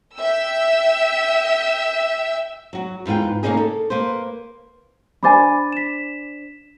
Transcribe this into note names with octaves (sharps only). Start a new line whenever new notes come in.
E5 G5 E6
F#3 F#4
E2 G#2 F4 B4 G5
C#3 F3 A#3 C#4 D#4 G#4
A4
A#3 B4 C5
D4 C5 G#5 B5 D6 A6
B6 E7